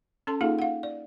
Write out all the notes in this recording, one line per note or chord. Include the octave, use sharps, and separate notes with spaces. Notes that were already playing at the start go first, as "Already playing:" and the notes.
C#4 A4 A5 C6
A#3 D#4 F4 G#4 A4 F5
F5 F#5
D5